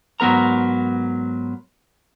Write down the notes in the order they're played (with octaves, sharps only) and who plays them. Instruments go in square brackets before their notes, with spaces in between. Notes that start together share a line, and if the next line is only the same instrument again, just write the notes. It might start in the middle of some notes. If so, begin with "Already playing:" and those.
[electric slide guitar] G#2 F#3 B3 A#4 A#5